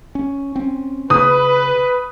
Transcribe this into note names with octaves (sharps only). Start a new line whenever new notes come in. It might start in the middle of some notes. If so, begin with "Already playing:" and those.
C#4
C4 C#4
C#3 B4 D#6